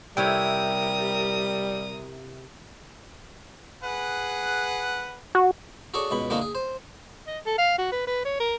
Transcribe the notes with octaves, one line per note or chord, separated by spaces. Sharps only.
C3 G3 E4 A#4 C#5 G5 D#6
G#4 B4 F#5
F#4
F#4 G#4 A4 C#5 D5 C#6
C#2 B2 B5 C#6
D3 E3 A#3 D#4 F#4
G#4
C5
D#5
A4
F5
F#4
B4
B4
C#5
A#4